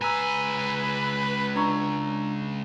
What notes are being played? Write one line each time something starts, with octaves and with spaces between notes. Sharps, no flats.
C#2 B4 G#5 A#5 E6
D4 A#5 C#6